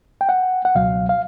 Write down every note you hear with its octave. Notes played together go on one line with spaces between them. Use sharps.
G5
F#5
F#5
C#2 B2 F#3 F5
F5